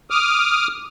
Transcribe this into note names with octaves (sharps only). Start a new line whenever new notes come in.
D6 D#6 F6